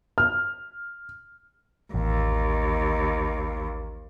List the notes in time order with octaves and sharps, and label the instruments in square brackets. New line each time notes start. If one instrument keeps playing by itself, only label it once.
[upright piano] F6
[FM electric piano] A1 [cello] D#2